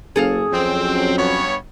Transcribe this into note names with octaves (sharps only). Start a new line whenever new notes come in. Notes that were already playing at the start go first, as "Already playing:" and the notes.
F#1 C#4 G#4 A4 F5
F2 F#3 C4 C#4
G2 B3 C#5